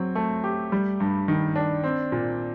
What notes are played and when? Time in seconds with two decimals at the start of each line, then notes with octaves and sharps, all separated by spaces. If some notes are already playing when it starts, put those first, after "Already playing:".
Already playing: F#3 C4
0.15 A3
0.44 G4
0.72 G3
1.00 G2
1.28 D#3
1.56 D4
1.84 C4
2.12 A#2